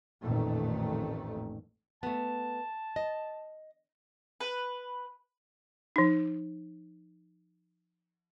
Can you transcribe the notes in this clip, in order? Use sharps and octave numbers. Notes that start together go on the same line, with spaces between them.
A1 F2 A#2 D#3 A3
A3 B3 A5
D#5
B4
F3 D#4